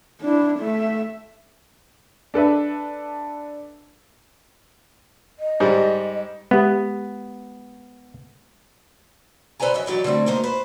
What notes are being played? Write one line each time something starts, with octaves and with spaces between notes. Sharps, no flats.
D4 E4
A3 E5
D4 A4 B4 E5
D#5
G#2 G3
G#3 B3 G4
A4 B4 C5 D5 G#5 A#5
F#3 D#5 E5
D#3 E3 F#3 G4 D5
D3 G3 A3 C4
D2 G#2 A#3 D#4 C5
B4 C5